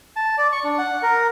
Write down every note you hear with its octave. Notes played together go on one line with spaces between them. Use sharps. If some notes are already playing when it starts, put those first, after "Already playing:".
A5
D5
C#6
D4
F#5
A#4